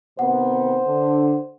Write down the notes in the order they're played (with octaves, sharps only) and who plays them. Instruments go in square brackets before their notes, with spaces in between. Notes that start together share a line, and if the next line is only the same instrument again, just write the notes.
[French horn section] C3 D#3 B3 [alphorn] C5 [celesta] F#5
[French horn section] D3